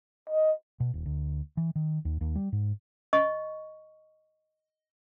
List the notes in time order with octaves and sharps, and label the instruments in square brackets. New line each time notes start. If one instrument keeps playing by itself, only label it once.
[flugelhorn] D#5
[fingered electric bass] B2
D#1
D2
E3
D#3
D#2
D#2
G3
G#2
[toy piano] D#5 C#6